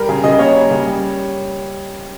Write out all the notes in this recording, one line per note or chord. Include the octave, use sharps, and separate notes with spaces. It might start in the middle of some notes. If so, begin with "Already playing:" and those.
Already playing: G3 A#4
C#3 G#4
C#3 D#5
A#3 C#5
G3
C#3
G3